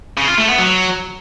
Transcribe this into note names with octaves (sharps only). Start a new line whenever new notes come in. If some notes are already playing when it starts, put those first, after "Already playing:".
C#3
F4
A3
B3
F#3